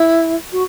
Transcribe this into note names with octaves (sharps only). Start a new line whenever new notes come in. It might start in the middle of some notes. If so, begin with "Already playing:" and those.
Already playing: E4
F#4